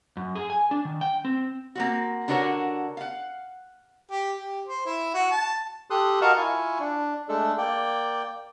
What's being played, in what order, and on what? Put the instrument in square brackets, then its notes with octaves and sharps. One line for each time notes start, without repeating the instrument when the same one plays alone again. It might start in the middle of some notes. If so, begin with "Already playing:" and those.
[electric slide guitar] F#2
G#4
G#5
D4
D#3
G5
C4
[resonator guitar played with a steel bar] A#3 C4 F#4
D3 D4 F#4 A#4 C#5
F5 F#5
[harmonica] G4
G4
C5
E4
F#4
A5
[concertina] G4 A4 C6 D#6 F#6
F#4 A#4 D#5 F5 A5 C#6
E4 F4 G#5 C#6
D4
G#3 A3 D4 A4
A#3 D5 G5